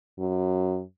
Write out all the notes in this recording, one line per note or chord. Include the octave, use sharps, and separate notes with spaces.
F#2